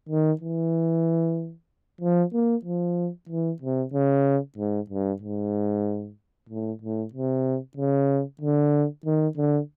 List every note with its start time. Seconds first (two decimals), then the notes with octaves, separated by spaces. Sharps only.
0.09 D#3
0.41 E3
2.01 F3
2.33 A#3
2.65 F3
3.29 E3
3.62 C3
3.93 C#3
4.58 G#2
4.90 G2
5.22 G#2
6.49 A2
6.82 A2
7.14 C3
7.77 C#3
8.41 D3
9.05 D#3
9.37 D3